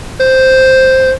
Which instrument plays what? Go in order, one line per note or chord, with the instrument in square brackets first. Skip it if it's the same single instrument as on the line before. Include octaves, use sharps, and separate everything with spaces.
[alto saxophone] C5